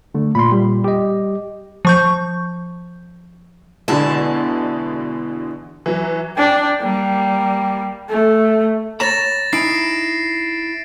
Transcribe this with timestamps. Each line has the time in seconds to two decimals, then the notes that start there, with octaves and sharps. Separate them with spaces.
0.14 D3 A3
0.35 A#2 B5 C6
0.52 G3
0.84 G4 D#5
1.85 F3 C#6 G6
3.88 E2 B2 D3 G#3 E4 A5
5.86 E3 F#3
6.37 D4 G5
6.81 G3 A#3
8.10 A3
9.00 C#5 A#5 B5 A6 A#6 E7
9.53 C#4 D#4 E4 C7 D7